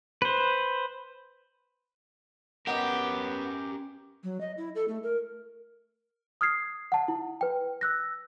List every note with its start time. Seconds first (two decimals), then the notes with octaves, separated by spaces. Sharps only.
0.22 B4 C5
2.67 B3 C#4 G4 A#4 D#5 F#5
4.24 F#3
4.41 D#5
4.58 E4
4.75 A4
4.88 A3
5.03 A#4
6.41 D#6 F6 G#6 C7
6.92 F#5 A5
7.08 E4
7.41 B4 G5
7.81 E6 F#6 A#6